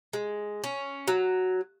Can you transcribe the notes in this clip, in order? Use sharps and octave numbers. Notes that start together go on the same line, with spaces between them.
G#3
C#4
F#3